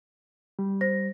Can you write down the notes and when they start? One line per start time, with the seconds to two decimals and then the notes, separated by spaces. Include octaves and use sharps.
0.59 G3
0.81 C5 A#6